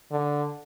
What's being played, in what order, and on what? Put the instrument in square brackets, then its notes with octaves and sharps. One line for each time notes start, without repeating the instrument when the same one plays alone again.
[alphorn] D3